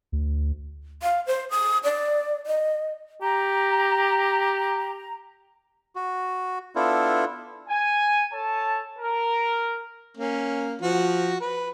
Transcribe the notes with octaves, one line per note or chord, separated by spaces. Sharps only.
D2
F5
C5
D#6
D5
D#5
G4 A#5
F#4
B3 D4 E4 F4 A4
G#5
A4 C#5 A5
A#4
A#3 C#4
F3 F#4
B4